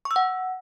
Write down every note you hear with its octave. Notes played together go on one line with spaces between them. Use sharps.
C#6
E6
F#5